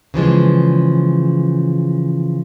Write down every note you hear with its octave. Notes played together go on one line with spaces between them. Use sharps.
C#3 E3 F3 G#3